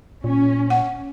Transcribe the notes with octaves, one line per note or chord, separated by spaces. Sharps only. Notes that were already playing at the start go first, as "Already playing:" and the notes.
A#2 C#4
F#5